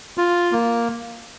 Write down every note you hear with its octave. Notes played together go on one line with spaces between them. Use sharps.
F4
A#3